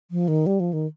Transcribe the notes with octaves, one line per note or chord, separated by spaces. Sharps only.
F3
D#3
G3
F3
D#3